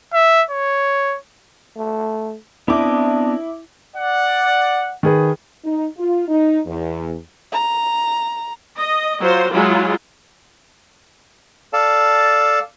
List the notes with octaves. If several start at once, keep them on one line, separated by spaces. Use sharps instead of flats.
E5
C#5
A3
B3 C4 D4 E4 D#5 D6
D5 F#5
D#3 G#4 B4
D#4
F4
D#4
E2
A#5
D#5
F#3 F4 C5
F#3 G#3 E4 F4
A4 D5 F5 A5